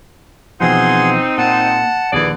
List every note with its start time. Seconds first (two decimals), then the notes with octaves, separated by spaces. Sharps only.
0.60 B2 E3 F3 C4 D#4 G#4 F#5 C6
1.38 A#2 F#5 A5
2.13 A#1 D#2 D3 E3 G#4 D5